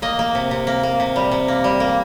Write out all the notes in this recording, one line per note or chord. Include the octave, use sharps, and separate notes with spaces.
A#3 D#5
A#3
C3
C3
A#3
A#3
C3
G3
C3
A#3
G3
A#3